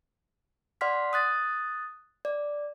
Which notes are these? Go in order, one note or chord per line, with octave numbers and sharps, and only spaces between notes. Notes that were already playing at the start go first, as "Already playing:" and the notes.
D5 F#5 C6 F6 B6
D#6 F#6 A6
D5